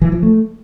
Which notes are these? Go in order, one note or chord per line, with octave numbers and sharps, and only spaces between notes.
E3
F3
A3